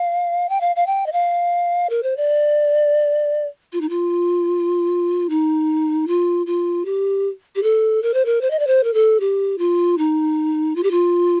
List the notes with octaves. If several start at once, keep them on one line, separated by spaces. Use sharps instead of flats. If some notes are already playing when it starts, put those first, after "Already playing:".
Already playing: F5
G5
F5
F5
G5
D#5
F5
A#4
C5
D5
F4
D#4
F4
D#4
F4
F4
G4
G4
A4
A#4
C5
A#4
C5
D#5
D5
C5
A#4
A4
G4
F4
D#4
F4
G4
F4